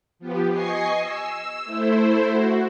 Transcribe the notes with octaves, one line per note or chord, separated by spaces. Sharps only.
F3 B3 G4
D#5 G#5 C#6 C7
E6
A3 E4 C5
F#4